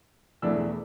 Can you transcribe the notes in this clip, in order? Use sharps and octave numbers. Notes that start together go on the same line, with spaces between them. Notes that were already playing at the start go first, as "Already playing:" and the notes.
E1 E2 E3 A3 D4 E6